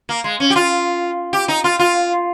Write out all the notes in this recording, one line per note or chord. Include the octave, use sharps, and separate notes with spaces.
A#3
G#3
C#4
G4
F4
G4
D#4
F4
F4